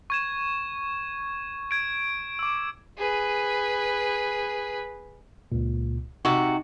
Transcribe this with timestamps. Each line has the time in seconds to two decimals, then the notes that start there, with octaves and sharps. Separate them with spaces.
0.10 C#6 G#6 E7
1.71 G#6 D7
2.39 D6 E6
2.98 G#4 B4
5.52 C#2 A#2
6.25 C3 D#4 F#4